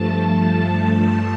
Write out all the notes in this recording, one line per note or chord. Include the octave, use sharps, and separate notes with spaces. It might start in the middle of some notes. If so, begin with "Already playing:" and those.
Already playing: G2 F3 A3 A5